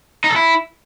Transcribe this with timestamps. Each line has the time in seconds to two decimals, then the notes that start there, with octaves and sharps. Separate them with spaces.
0.24 D#4
0.30 A4
0.36 E4